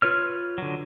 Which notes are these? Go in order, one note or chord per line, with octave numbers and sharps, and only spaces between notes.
F4 B4 C#5 F6
D3 F#3